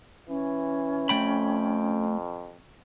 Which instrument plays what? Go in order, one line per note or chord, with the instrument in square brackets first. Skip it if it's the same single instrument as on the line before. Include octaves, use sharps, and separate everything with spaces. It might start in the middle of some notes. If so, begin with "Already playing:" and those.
[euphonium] E3 [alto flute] C#4
[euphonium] F2 [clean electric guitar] A3 G5 B5